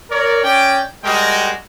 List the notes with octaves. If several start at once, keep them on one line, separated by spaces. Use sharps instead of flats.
A#4 C#5 D5
C#4 D5 G5
G3 G#3 F#4 A#4 D#5 G5